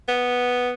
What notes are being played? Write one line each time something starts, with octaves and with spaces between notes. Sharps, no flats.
B3